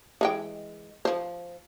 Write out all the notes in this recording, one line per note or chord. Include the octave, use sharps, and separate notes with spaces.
E3 G#3 G5
F3 C5